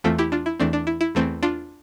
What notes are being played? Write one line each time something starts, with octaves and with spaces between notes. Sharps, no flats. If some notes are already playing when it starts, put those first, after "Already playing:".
E2 E3 A3 C4 F4 A4
E4 G4
D4 F4
E4
E2 E3 A3 C4 D4
D4
E4
E4
E2 E3 A3 C4
D4 F4